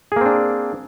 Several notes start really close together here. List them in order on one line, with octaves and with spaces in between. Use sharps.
G#4 A#3 C4 D4